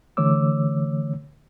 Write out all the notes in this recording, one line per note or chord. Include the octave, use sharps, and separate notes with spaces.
D3 E3 A3 C#5 D6 E6